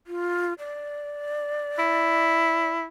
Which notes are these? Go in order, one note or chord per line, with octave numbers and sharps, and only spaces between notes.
F4
D5
E4